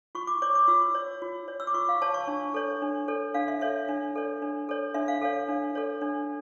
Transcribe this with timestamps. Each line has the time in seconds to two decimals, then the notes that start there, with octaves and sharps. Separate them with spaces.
0.15 F4 C#6
0.27 D6
0.42 C#5 D6
0.55 D6
0.68 F4 E6
0.95 C#5
1.22 F4
1.48 C#5
1.60 E6
1.67 D6
1.74 F4 C#6
1.89 F5
2.02 C#5 A5
2.14 C#6
2.28 D4
2.54 A4 C#5
2.82 D4
3.08 A4 C#5
3.34 D4 F5
3.48 E5
3.61 A4 C#5 E5
3.89 D4
4.15 A4 C#5
4.42 D4
4.69 A4 C#5
4.94 D4 E5
5.08 F5
5.22 A4 C#5 F5
5.48 D4
5.75 A4 C#5
6.01 D4